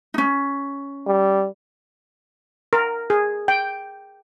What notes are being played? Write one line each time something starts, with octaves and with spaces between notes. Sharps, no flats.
C#4 D#4
G3
A#4
G#4
G5